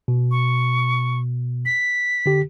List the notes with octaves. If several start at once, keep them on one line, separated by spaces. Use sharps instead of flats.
B2
C#6
B6
D3 G4